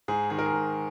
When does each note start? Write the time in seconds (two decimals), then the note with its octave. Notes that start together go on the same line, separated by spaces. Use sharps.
0.08 G#2 G#4
0.30 D#3 G#4
0.39 A#4
0.46 G#4
0.53 G#2